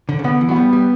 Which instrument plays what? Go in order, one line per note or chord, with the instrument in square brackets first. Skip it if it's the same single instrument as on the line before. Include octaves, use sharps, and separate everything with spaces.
[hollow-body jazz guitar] D3
C#3
[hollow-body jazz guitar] D3 [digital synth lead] B3
[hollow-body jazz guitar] E3
F#3
[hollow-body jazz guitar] G3 [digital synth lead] B3
[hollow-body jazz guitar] G3